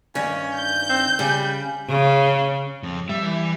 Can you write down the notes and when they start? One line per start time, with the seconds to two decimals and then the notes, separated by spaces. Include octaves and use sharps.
0.15 G2 D#3 C#4
0.55 G6
0.89 C4
1.19 C#3 G3
1.89 C#3
2.83 F2
3.09 G3 E5
3.23 E3